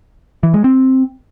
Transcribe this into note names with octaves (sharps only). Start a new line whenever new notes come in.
E3
G#3
C4